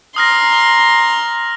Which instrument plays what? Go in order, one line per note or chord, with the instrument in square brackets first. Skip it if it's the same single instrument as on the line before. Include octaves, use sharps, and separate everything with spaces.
[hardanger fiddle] A#5 C6 [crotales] D#6 F6 A#6